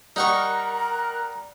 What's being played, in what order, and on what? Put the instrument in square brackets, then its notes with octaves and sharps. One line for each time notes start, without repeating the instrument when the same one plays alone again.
[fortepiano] G3 [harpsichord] D#4 F#5 C#6 [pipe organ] A#4 F#6 [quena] A#5